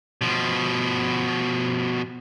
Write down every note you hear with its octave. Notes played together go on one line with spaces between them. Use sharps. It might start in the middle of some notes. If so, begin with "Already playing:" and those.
B2 F3